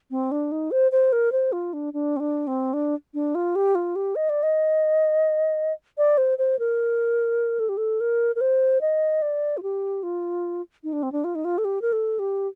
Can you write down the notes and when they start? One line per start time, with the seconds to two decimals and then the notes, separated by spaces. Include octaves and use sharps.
0.11 C4
0.31 D4
0.52 D#4
0.71 C5
0.92 C5
1.12 A#4
1.32 C5
1.52 F4
1.73 D4
1.94 D4
2.17 C4
2.20 D4
2.47 C4
2.73 D4
3.14 D4
3.35 F4
3.56 G4
3.75 F4
3.96 G4
4.16 D#5
4.29 D5
4.43 D#5
5.98 D5
6.18 C5
6.38 C5
6.59 A#4
7.59 A4
7.69 G4
7.77 A4
8.00 A#4
8.36 A#4
8.41 C5
8.81 D#5
9.22 D5
9.57 F4
9.63 G4
10.03 F4
10.84 D#4
10.93 D4
11.03 C4
11.12 D4
11.24 F4
11.35 D#4
11.45 F4
11.58 A4
11.65 G4
11.82 A#4
11.93 A4
12.19 G4